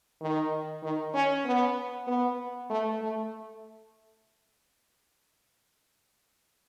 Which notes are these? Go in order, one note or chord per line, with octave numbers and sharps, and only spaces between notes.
D#3
D#3
C#4
B3
B3
A3
A3